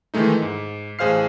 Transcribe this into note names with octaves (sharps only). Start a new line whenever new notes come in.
D#3 E3 G#3 A3 D#4
G#2
A1 G#4 C5 F5 F6 C7